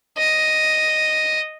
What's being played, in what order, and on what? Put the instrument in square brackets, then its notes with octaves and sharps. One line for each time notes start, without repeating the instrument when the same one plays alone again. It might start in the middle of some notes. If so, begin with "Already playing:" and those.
[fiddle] D#5